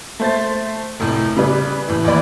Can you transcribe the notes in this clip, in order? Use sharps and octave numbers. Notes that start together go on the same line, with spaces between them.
A3 C5 A6
F1 A2
C#3 G3 B4 D5
A2 E3
D#2 E3 D5 B5